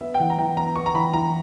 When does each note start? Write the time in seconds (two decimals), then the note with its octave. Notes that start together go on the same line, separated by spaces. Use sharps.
0.01 B3 E5
0.14 G5
0.19 E3 F#5
0.30 A#5
0.38 E3 G5
0.57 B3 A#5
0.76 B3 C#6
0.86 A#5
0.94 E3 B5
1.13 E3 A#5